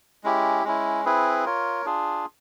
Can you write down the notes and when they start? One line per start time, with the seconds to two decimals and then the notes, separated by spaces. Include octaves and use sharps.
0.24 G#3 C#4 E4 G4
0.64 G#3 C#4 E4
1.05 C4 E4 G#4 B4
1.45 F4 A#4 C#5
1.86 D4 F4 G#4